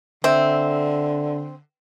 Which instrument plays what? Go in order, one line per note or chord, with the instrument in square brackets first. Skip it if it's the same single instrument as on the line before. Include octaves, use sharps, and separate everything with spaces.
[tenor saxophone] D3 [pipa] C4 [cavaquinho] E5